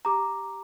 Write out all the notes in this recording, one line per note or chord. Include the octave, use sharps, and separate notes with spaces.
G4 A#5 D6